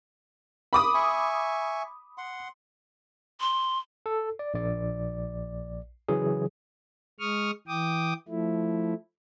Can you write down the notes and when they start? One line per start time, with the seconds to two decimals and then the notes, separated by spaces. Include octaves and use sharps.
0.73 B5 D6 D#6
0.94 E5 G#5 C#6
2.18 F#5 C6
3.40 C6
4.06 A4
4.39 D5
4.54 A#1 D5
6.08 C#3 E3 F#3 G#4
7.20 G#3 C#6 D#6 F6
7.68 E3 G5 D6 D#6
8.28 F3 A3 E4